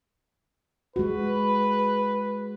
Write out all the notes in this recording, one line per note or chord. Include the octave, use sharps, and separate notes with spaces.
G#3 F#4 B4